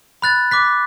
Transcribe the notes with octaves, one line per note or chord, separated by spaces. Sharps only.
B5 F#6 A6
D6 F#6 B6